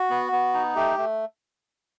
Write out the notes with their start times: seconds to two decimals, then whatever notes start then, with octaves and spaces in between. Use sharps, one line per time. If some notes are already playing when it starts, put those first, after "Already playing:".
Already playing: F#4
0.10 B3
0.32 B3
0.54 D#4
0.75 A3 G4
0.98 A3